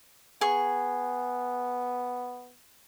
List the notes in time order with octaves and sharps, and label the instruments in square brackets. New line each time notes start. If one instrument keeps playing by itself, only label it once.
[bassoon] B3 [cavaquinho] G#4 C#6